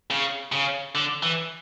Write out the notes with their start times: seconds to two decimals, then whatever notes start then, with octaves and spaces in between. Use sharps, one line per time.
0.10 C#3
0.52 C#3
0.95 D3
1.23 E3